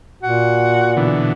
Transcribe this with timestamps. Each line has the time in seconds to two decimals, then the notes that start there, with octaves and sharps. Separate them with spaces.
0.23 A#2 F#4
0.97 B2 D3 E3